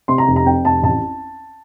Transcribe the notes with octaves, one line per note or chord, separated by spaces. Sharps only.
C3 C6
A#5
F1
A#5
F2 G5
F1 A5
A1 A5